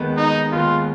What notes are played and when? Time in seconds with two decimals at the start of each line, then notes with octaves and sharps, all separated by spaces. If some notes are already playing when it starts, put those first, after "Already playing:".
Already playing: D#2 D#3 G#3 B3
0.17 D#4
0.52 D#2 D#3 G#3 B3 F4